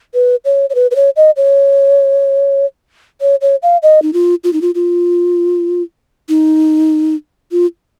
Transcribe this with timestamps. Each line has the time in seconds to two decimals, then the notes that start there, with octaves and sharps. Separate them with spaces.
0.14 B4
0.45 C#5
0.70 C#5
0.75 B4
0.91 B4
0.96 C#5
1.16 D#5
1.37 C#5
3.21 C#5
3.41 C#5
3.63 F5
3.83 D#5
4.02 D#4
4.13 F4
4.44 F4
4.53 D#4
4.62 F4
4.75 F4
6.29 D#4
7.52 F4